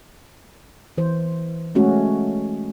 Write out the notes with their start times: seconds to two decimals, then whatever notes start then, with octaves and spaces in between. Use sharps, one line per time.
0.98 E3 C5
1.75 G#3 A3 C#4 F#4